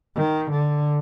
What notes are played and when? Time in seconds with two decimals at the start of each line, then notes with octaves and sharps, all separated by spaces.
0.16 D#3
0.51 D3